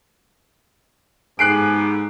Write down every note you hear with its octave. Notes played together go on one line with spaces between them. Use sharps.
G#2 B3 G4 A4 G#5 F#6 C7 D7